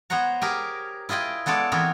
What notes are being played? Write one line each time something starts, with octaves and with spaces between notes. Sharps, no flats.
B3 C5 C#5 F#5 A#5
G4 G#4 A#4
E4 F4 G#4 D#5 G5
G#3 B3 A4 C#5 D5
E3 B3 C4 G#4 A#4 C#5